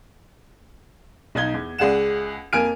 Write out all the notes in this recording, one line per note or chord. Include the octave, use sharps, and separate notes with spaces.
B1 D#4 G#6 G7
E2
C#2 G#4 D5 F#5 E7
F2 A#3 G#5 F6 D7